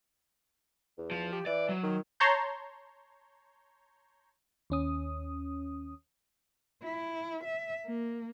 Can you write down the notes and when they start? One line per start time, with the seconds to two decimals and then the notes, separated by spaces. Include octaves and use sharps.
0.98 E2
1.11 F3
1.32 G4
1.46 E3 D5
1.69 F#3
1.83 D#3
2.20 C#5 A5 A#5 C6 G6
4.70 D#2 C#4 D#6
6.83 E4
7.44 E5
7.86 A#3